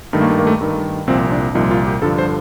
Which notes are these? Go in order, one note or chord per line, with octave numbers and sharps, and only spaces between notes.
G2 D#3 A3
A#3
A3
A#3
A3
G2 D#3
C2 A#2 F3 C4
D4
C2 A#2 F3 D#4
F4
G4
G2 D3 F3 A4
C5